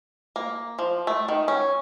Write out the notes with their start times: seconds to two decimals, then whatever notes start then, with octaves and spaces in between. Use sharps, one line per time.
0.36 A#3
0.79 F3
1.07 A3
1.28 D#3
1.48 C#4